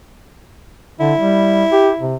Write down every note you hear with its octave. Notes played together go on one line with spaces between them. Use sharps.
D3 E4
G3
G4
C3